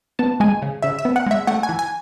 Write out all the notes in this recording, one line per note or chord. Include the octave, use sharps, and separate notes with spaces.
B3 A5
G#3 G#5
C#3
C#3 E5
E5
B3
F#5
G#3 E5
A3 F#5
G#5
E3
G#5